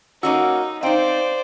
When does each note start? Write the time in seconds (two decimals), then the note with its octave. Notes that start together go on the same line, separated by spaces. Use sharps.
0.23 A#3 C#4 D#4 F#4 F#5 E6
0.83 C4 D#4 C5 D5 F5 G5 D7